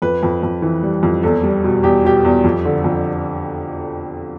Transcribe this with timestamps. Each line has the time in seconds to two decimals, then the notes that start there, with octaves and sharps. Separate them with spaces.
0.02 F2 B4
0.23 F2
0.43 F2
0.62 E3
0.83 G3
1.03 F2
1.23 E2 A4
1.43 G3
1.64 B2
1.83 E2 G4
2.05 B2 G4
2.25 E2
2.44 F2
2.65 D3
2.84 F2